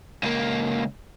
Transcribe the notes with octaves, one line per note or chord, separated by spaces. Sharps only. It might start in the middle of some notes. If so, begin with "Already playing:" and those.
C#2 A#3